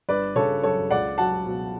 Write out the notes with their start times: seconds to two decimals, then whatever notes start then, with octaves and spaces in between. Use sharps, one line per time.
0.09 G1 B4 D5
0.36 C#3 A4 C#5
0.63 F#2 A4 C#5
0.91 C#2 D5 F#5
1.18 F#3 F#5 A5
1.46 B2